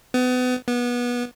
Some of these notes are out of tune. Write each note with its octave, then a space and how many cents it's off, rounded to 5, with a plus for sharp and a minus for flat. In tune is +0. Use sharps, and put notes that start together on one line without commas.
B3 +30
B3 -25